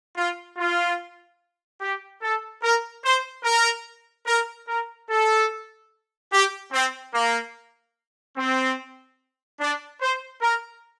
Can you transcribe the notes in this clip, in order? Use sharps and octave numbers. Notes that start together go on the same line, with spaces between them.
F4
F4
G4
A4
A#4
C5
A#4
A#4
A#4
A4
G4
C4
A#3
C4
D4
C5
A#4